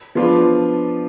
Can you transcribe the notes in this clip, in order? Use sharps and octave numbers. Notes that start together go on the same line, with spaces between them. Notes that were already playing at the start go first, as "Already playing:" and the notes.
F3 B3 D4 F4